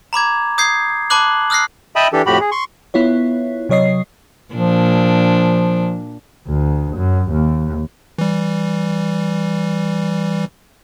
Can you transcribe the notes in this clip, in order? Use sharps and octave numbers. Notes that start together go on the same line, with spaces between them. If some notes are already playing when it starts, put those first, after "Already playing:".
A#5 B5 D6 G#6
D#6 G6 G#6 C7
A5 B5 D6 F#6 F#7
D#6 F6 F#6 A#6 C7
D#5 E5 G5 A5 B5 D#6
E3 D4 G4 A4
F2 A2 F#4 G4 B5
G#4
C6 C#6
B3 E4 F4 C#5
C3 F#3 C#5 D#5 C7
A#2 F3 D4
D2
F#2
D#2
E3 G3